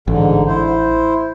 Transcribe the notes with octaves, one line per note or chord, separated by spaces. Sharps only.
A1 G#2 D3
E4 C5